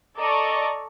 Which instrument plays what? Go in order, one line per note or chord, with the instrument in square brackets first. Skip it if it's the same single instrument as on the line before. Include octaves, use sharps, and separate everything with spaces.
[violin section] A4 D5 D#5 A#5 C#6 D6